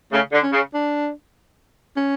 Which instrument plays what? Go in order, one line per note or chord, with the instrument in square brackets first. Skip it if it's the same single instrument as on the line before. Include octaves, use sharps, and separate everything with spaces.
[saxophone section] C#3 [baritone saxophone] A3
[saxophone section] D3
[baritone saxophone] C#4
[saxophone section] C#3
[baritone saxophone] D4
C#4